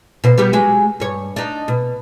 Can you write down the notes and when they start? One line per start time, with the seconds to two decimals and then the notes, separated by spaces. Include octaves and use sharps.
0.24 B2 C5
0.38 G3 B3 G4
0.53 F#3 G#3 G4
1.00 G2 C#5
1.36 D4 D#4
1.68 B2